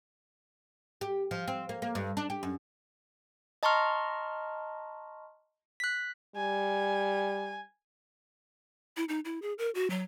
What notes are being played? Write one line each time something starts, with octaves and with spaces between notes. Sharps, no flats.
G4
F3
C4
A#3
A#3
G2
D4
G4
F#2
D#5 A5 A#5 C6 C#6 F6
F#6 B6
G3 G#5
E4
D#4
E4
G#4
A#4
F#4
F#3